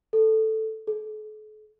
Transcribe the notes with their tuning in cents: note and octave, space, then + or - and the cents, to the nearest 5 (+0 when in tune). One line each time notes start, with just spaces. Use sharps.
A4 +0
A4 -45